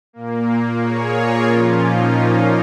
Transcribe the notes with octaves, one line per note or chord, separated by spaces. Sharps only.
A#2 A#3
G#4 C#5
F4 A#4
A#2 F3 A#3 C#4 F4
D#4
D#4